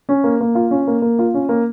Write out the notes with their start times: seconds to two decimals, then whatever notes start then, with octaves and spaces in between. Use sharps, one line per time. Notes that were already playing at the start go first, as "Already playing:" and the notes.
0.09 C#4
0.24 A#3
0.41 A#3
0.55 F4
0.71 C#4
0.87 A#3
1.02 A#3
1.19 F4
1.34 C#4
1.49 A#3